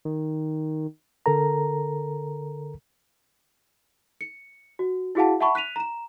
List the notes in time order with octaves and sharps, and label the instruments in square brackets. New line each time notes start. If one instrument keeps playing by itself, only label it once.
[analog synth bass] D#3
[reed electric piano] D3 A4 A#4 A#5
[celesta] C#7
F#4
E4 F#4 G#4 F5 F#5 A5
E5 F#5 A5 B5 C#6
F#6 B6 D#7 F7
A#5 E7